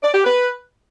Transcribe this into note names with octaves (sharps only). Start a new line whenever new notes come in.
D5
G4
B4